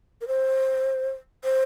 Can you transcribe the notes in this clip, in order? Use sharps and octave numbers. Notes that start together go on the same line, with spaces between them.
A#4
C5
C5